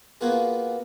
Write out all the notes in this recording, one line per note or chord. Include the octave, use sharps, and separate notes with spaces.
A#3 B3 F4 F#4 G#4